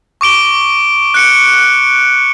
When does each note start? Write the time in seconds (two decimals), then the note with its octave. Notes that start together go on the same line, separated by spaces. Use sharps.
0.21 C#6 D6 D7 G7
1.14 F#6 C#7 D7